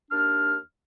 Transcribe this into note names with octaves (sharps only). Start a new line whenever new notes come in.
D#2 D4 F6